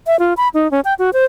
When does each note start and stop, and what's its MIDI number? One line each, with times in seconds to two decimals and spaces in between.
0.07 0.19 76
0.19 0.34 65
0.37 0.48 83
0.54 0.70 63
0.71 0.80 61
0.85 0.94 79
0.99 1.10 66
1.13 1.25 72